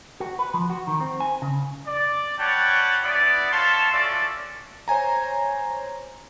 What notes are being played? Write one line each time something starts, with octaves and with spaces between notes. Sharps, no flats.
F#4
B4
F3
F#4
D#3
C4
G#5
C#3
D5
G3 C#5 F#5 G5 A5
B3 E4 D5
A4 C#5 E5 F5 A5 C6
C#4 F4 F#4 A4 D5 E5
C5 C#5 G#5 A#5